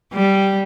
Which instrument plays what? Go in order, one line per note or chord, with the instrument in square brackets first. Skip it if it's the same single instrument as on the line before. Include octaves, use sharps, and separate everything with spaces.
[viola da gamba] G3